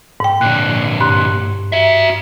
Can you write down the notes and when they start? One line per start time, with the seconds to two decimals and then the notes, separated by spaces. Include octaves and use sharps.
0.20 G#2 G5
0.41 A#2 D3 F#6
1.01 G2 C6 F#6
1.72 F#4 E5